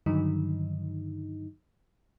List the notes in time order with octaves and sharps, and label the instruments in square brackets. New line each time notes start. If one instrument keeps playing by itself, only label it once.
[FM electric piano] G2 D3 D#3 F#3 D#4